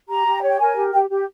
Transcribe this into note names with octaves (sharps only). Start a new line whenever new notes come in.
G4 A#5
G4
C#5
G5
A#4 G#5
G4
G4 G5
G4